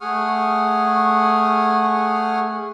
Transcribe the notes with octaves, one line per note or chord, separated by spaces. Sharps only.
A3 G#4 F#5 C#6 D#6 F6